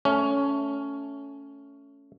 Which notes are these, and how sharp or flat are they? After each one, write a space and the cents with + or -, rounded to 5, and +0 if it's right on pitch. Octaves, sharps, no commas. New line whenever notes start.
A3 +0 C#4 +10